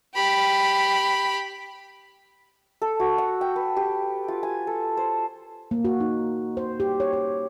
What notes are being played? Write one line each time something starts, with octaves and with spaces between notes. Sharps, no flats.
G4 B5
A4
F#4
F#5
G5
B4
G4
F4
G#5
A4
C5
A#3
F#4
D#4
C5
G4
C#5
C#5